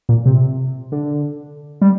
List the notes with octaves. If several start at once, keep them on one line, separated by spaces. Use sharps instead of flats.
A#2
C3
D3
G3